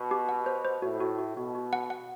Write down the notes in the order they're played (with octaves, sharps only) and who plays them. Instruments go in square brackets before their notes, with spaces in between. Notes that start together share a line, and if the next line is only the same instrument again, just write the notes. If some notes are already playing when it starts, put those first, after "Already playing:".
Already playing: [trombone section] B2
[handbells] G4
F#5
C5
C5
[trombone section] A2 [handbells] F#4
[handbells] F#4
F#4
[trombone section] B2 [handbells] F#4
[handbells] F#4
F#5
F#5